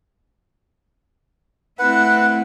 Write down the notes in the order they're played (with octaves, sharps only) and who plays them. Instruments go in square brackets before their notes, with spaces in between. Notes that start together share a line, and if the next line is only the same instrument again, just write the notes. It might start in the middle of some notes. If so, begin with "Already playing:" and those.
[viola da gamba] A3 C4 E4 [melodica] B4 F#5